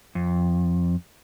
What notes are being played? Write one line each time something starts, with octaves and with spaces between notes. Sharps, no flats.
F2